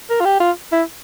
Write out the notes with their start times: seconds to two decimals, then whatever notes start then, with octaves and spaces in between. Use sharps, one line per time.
0.10 A#4
0.21 F4
0.25 G4
0.40 F4
0.72 E4